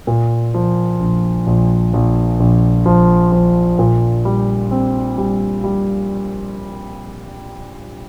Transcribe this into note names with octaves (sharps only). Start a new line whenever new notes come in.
A#2
F3
A#1
A#1
A#1
A#1
F3
F3
A#2
G3
C4
G3
G3